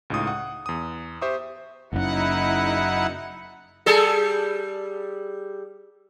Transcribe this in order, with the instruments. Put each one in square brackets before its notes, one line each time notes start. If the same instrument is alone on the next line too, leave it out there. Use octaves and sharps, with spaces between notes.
[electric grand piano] C#2 A2 D#4 F4 D#6
F#5
E2 D#6
G4 C5 E5 C#6 D#6
[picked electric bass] F#1 F#2 [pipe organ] D#4 E4 F#5
[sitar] G3 G#4 A4